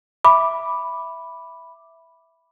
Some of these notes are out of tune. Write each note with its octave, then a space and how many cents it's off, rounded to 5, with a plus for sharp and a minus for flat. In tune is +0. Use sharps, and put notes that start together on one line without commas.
E5 +0 B5 +0 D6 +0